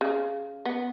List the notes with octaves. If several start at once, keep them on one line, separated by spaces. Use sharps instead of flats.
C#3
B3